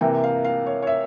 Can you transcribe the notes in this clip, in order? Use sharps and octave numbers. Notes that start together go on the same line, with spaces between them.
C3 E3 A#3 G5
F5
F5
C#5
C#5
E5